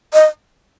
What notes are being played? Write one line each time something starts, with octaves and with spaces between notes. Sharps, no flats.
D#5